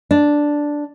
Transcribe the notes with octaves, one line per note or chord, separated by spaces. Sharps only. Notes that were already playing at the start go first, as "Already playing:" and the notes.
D4